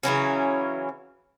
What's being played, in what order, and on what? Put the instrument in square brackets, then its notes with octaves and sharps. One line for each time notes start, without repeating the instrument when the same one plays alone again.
[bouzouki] C#3 E3 F#3 C#4